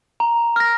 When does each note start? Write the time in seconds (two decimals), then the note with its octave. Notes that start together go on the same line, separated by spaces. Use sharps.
0.20 A#5
0.56 F6 A#6